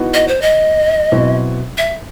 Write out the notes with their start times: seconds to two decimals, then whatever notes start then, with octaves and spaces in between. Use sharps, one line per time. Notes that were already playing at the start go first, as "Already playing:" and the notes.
Already playing: E3 B3 D#4 F#4
0.14 D#5
0.28 C5
0.42 D#5
1.12 B2 F#3 C4 E4
1.78 E5